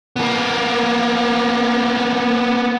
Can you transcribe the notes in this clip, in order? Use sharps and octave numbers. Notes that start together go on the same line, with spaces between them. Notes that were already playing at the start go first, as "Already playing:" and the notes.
A#3 B3